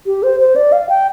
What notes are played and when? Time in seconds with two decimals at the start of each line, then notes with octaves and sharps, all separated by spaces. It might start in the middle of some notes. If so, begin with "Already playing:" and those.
0.06 G4
0.23 C5
0.40 C5
0.56 D5
0.72 F5
0.89 G5